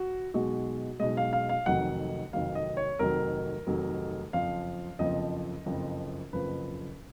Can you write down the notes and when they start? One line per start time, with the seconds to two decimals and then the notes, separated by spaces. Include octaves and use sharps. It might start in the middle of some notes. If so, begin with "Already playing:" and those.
Already playing: F#4
0.34 B1 B2 G#3 F#4
1.00 B1 B2 G#3 D#5
1.17 F5
1.33 F5
1.49 F5
1.66 F1 F2 D#3 F#3 F#5
2.33 F1 F2 D#3 F#3 F5
2.55 D#5
2.77 C#5
2.99 F1 F2 D#3 F#3 A#4
3.67 F1 F2 D#3 F#3
4.33 F#1 F2 F3 F5
4.99 F#1 F2 F3 D#5
5.66 F#1 F2 F3
6.33 F#1 F2 F3 B4